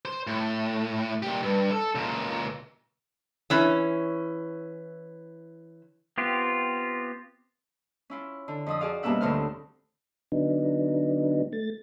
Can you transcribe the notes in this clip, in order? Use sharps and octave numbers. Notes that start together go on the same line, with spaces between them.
C5
A2
A#2 G4
G2
A4
C#2 A#2
E3 C#4
B3 C4 F4 G4
C#4 E4 F4
D3
F2 F3 D#6
F#4 G#4 D5 F5
G2 B2 A#3 C#4 E5 F#5
D2 A2 D3 C4 F6
D3 F#3 B3 D4 D#4
A3 A6